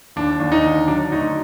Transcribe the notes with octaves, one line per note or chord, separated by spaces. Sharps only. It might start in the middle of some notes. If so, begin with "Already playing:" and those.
D#2 D4
D#2
D#4
D3
F#3 D4
D2 D#4